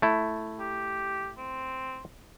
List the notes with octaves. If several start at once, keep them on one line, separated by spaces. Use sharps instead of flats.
A3 E4
G4
C4